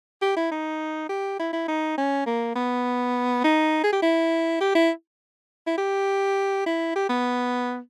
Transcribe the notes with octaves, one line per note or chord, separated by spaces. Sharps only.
G4
E4
D#4
G4
E4
E4
D#4
C#4
A#3
B3
D#4
G#4
G4
E4
G4
E4
E4
G4
E4
G4
B3